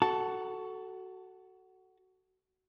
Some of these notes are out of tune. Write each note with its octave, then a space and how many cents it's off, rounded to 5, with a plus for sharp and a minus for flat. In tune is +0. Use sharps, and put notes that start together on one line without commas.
F#4 +15 A4 +0 A5 +0